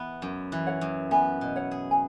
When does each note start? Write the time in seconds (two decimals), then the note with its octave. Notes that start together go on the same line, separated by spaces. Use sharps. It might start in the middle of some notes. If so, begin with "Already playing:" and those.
Already playing: E3 B3
0.22 F#2
0.52 E3
0.66 C#5 F#5
0.81 F#2
1.11 B3 E5 G#5
1.41 B2
1.56 C#5 F#5
1.71 G#4
1.91 G#5